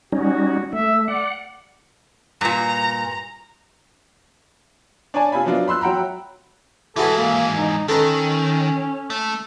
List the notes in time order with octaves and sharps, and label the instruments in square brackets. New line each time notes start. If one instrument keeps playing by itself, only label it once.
[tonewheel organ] G3 C#4 D#4 [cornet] F#4
[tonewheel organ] A3 [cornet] E5
[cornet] D5 [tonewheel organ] F#5
[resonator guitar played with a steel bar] G2 A#2 [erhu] A#5
[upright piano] D4 C#5 D5 G#5 A5
C3 F4 G#5 B5
F3 F#3 B3 D4 F4
B5 C6 E6 F#6
F#3 F#5 G5 A#5 B5
[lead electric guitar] G#2 E3 [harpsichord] E4 F#4 B4 [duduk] A4
[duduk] A#3
D#4
[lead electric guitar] D#3 [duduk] C#4 [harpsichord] A4 B4 A#5
[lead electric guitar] A3